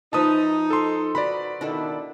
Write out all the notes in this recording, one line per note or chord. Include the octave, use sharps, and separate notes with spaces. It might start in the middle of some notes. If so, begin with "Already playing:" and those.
F3 D#4 B4 E5 A5 D#6
A4 C6
F#4 B4 D5 A#5 B5
B2 D#3 D4 E4 A4